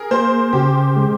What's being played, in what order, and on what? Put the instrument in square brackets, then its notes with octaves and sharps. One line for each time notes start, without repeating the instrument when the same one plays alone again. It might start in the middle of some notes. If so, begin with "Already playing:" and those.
Already playing: [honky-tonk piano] G#4 A#4
[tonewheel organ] A#3 [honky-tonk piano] C5
[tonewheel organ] C#3 [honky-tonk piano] G4
[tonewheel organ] G#3